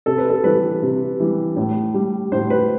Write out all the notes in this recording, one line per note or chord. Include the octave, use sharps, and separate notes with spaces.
C3 A4
B4
A4
E3 G3 B4
C3
E3 G3
A2
G3
A2 C5
B4